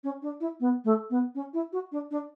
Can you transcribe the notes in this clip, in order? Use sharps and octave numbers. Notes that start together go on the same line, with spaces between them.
C#4
D4
E4
B3
A3
B3
C#4
E4
F#4
D4
D4